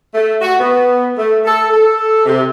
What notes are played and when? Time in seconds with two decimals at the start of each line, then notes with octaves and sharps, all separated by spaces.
0.14 A3
0.41 F#4
0.60 B3
1.18 A3
1.45 A4
1.70 A4
2.26 C3